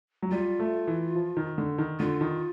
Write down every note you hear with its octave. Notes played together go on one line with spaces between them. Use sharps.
F#3
G3 F4
A3
E3
F3
D#3
D3
D#3
D3 F4
D#3